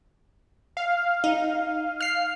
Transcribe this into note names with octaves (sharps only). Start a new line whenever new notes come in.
F5
D#4
F6 C7